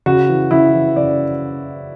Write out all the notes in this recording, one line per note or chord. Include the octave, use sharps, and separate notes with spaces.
C#3 F#4
E3
C#3 E4
E3
C#3 D5